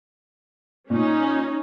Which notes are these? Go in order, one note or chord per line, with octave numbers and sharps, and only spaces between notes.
A#2 C#4 D#4